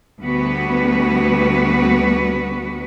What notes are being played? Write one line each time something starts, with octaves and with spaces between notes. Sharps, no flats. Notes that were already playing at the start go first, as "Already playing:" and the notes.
D2 G3 B3 F#4 B4